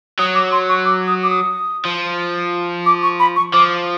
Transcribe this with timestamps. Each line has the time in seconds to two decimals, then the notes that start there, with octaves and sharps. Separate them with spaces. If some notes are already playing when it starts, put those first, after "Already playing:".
0.19 F#3 D#6
0.35 D6
0.52 C6
0.69 C#6
0.85 D6
1.07 D#6
1.23 D6
1.30 D#6
1.85 F3
2.86 D6
3.03 C#6
3.20 B5
3.36 C#6
3.53 F3 D6